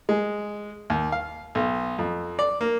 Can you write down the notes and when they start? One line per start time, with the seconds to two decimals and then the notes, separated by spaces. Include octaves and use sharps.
0.09 G#3
0.90 D#2
1.12 F5
1.55 B1
1.99 F2
2.39 D5
2.61 A#3